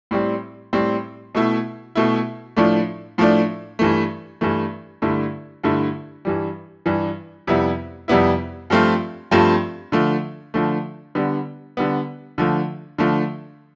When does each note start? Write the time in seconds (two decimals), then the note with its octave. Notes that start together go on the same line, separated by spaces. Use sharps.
0.11 A2 G3 C4
0.73 A2 G3 C4
1.35 B2 A3 E4
1.95 B2 A3 E4
2.56 A2 F3 A3 D4
3.18 A2 F3 A3 D4
3.79 G2 E3 A3
4.41 G2 E3 A3
5.02 G2 D3 A3 E4
5.64 G2 D3 A3 E4
6.25 G2 E3 G3
6.86 G2 E3 G3
7.47 F2 C3 G3 B3 E4
8.08 F2 C3 G3 B3 E4
8.70 G2 F3 A3 C4 F4
9.31 G2 F3 A3 C4 F4
9.92 D3 F3 A3
10.54 D3 F3 A3
11.15 D3 G3 B3
11.77 D3 G3 B3
12.38 D3 F3 A3
12.98 D3 F3 A3